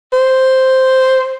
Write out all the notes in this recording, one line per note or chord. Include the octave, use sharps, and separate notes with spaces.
C5